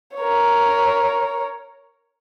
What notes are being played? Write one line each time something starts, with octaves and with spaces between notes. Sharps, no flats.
A#4 C#5